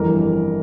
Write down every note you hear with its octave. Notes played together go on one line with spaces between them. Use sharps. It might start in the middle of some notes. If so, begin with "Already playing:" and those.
Already playing: G1 F2 E3 A#4